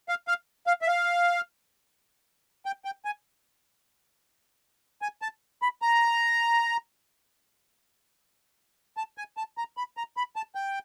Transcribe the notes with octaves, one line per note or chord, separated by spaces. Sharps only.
F5
F5
F5
E5
F5
G5
G5
G#5
G#5
A5
B5
A#5
A5
G#5
A5
A#5
B5
A#5
B5
A5
G5